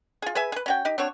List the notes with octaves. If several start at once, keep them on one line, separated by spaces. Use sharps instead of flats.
F4 G#4
G#4 B4 E5 G#5
G#4 B4
C#4 F#4 G5
D#4 G4
C4 D4 F#4 C#5